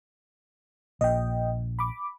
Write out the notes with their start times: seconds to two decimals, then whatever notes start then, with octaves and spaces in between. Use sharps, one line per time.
1.01 A#1 D#5 G5
1.79 B5 D6